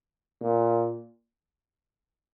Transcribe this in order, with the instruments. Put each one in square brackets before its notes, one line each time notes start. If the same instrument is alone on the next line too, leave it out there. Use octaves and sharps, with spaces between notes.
[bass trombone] A#2